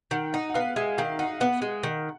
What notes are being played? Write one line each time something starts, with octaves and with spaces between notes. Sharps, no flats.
D#3 F#5
D#4 F#5
F#5
B3 F5
G#3 E5
D#3 F5
D#4 F#5
B3 F#5
G#3
D#3